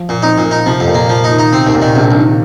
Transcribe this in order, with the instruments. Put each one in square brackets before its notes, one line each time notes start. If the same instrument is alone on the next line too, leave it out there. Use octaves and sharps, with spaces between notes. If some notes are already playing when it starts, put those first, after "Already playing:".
Already playing: [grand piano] F3
[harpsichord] A#2
[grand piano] C4 [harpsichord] D#4
[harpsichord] A#2
[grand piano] A#3
[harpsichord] D#4
[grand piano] C3 [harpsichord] F3
[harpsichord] F2
[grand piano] A#2
[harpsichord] A#3
F3
D#4
[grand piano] D#3
[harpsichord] D#4
[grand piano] C3 [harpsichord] C4
[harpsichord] D#2 [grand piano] C3
[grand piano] A#2
[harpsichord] D#3
[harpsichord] A#1 [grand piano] C3
[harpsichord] A#1
[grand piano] D#3